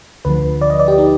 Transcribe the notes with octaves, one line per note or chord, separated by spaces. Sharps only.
D2 D3 F3 B4
D5
D#5
D5
G4
D#4